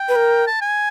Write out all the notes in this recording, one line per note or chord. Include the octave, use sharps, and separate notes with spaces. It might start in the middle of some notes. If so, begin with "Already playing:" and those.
Already playing: G5
B4
A#4
A5
G#5